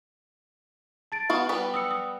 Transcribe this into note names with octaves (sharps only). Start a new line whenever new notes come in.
A5 A6 D7
B3 F#4 F5
G3 B3 B4
D#6 E6 C#7
D#6